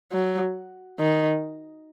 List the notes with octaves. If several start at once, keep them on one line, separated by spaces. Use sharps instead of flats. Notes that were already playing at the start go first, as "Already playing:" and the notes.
F#3
D#3